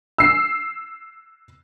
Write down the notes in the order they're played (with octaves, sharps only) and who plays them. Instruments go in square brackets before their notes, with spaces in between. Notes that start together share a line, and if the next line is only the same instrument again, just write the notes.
[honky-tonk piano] E6 C7